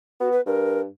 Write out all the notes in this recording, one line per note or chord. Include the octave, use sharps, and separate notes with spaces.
B3 F#4
B4
G2 A#4